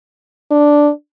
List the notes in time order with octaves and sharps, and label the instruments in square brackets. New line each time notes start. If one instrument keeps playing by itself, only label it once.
[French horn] D4